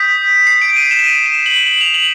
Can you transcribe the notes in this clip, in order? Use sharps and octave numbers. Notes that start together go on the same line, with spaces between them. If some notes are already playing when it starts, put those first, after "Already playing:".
Already playing: D#6 G6 B6
C7
D7
D#7
E7
D#7
E7
F#7
F#7
F7
F#7